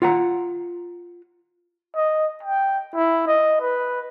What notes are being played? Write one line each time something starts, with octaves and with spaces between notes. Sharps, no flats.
F4 F#5 A#5
D#5
G5
E4
D#5
B4